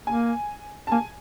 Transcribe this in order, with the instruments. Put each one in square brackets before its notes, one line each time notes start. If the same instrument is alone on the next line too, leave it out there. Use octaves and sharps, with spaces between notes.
[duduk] A#3 [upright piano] G#5
[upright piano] A5
[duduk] A#3 [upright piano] G#5